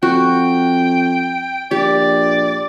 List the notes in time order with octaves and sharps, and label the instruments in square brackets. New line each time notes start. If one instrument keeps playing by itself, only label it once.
[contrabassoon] F2 [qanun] F#4 [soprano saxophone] G5
[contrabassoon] A#1 [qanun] G4 [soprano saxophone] D5